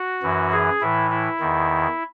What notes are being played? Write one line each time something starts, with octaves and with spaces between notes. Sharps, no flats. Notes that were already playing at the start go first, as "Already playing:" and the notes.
Already playing: F#4
F#2 E3
G#4
A2 E3 E4
E4
E2 D#3